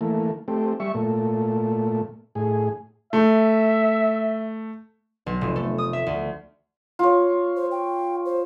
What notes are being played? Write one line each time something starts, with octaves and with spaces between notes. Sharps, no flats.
E3 A3 A#3
A3 C4 G4
G3 E5 C#6
A#2 A3
A2 G#4
A3 E5
B1
F1
A3
D#6
E5
D2
F4 C#5
C5
G5
C5